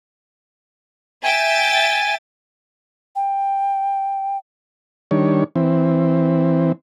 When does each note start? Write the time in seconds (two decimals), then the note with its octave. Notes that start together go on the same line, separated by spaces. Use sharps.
1.24 E5 G5 G#5 A6
3.16 G5
5.11 D#3 G3 D4 C#5
5.56 E3 C4